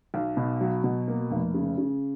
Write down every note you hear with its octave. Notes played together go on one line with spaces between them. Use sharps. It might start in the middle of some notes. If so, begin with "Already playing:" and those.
B1
B2
F#3
B2
A#3
F1
C#3
C#3